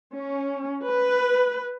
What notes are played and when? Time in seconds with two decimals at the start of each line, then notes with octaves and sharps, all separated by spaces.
0.16 C#4
0.85 B4